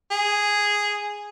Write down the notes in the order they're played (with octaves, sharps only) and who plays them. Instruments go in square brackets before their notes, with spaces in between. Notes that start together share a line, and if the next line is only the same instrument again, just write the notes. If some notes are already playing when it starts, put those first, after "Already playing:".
[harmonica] G#4